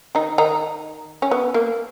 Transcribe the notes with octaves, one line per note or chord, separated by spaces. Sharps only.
D#3 D#4
D#3 D#4
C#4
B3
A#3